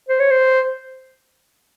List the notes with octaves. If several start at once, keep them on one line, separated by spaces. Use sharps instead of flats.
C5
C#5
C5